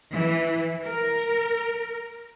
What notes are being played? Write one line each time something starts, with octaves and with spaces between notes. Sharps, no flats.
E3
A#4